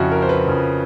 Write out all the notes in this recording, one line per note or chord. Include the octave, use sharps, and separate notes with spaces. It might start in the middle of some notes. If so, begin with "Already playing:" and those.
Already playing: F2 C#3 F3 E4 F#4
A#4
C5
B4
F2 C#3 F3